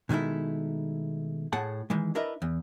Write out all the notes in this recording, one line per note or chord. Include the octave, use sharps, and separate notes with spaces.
B2 D#3 G#3 A3 E4
A2 G#4 F#5 A5
D#3 E3 G#3
D4 E4 A#4 B4 D#5 E5
E2